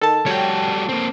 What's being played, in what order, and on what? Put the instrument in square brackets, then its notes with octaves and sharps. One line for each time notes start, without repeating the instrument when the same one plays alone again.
[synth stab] D#3 [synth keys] A4 A5
[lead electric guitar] G3 F#4 [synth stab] C#5 G5
[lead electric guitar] A#3 C4